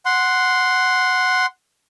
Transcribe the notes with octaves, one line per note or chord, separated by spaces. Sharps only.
F#5 C6